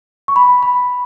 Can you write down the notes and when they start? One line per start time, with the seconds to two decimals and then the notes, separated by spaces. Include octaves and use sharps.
0.28 C#6
0.36 B5
0.63 B5